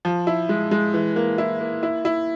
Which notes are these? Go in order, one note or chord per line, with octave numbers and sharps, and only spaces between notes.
F3
E4
G#3
G#3
E3
A#3
E4
A#3
E4
E4